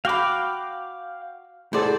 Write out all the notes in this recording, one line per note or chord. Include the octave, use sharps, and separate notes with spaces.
F#4 F5 G5 B5 D6
A2 G#4 A4 C5 D5